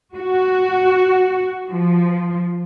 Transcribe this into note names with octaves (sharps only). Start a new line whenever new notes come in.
F#4
F3